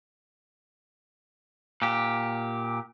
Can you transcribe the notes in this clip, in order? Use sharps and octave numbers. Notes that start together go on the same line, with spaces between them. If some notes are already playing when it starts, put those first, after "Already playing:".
A#2 G4